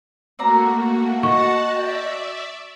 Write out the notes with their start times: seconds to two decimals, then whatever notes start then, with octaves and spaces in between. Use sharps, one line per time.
0.39 A3 A#3 C4 F#4 D5 A#5
1.23 F#4 D#5 F#5 A5 C#6
1.76 D5 E5 G5